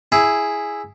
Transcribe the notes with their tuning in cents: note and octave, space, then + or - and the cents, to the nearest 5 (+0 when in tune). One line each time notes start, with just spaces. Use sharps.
E4 +0 G#4 +0